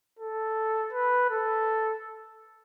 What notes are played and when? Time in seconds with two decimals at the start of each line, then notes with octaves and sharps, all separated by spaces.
0.19 A4
0.92 B4
1.29 A4